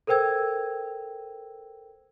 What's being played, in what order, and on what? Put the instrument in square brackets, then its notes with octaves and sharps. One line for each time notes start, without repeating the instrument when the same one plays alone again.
[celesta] A4 A#4 C5 G5 E6 G#6